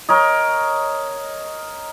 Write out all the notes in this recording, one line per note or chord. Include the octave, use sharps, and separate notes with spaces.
A#4 C#5 D#5